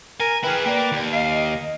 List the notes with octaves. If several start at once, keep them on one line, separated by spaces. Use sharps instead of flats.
A#4 G#5
E4 G#4 B4 G5 F6
A#3 D5 G5
D#2
D#5 F5